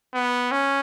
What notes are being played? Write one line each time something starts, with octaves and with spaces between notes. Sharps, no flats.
B3
C#4